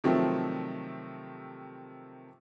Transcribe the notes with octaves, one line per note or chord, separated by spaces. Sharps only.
C3 D#3 F3 F#3 A3 C4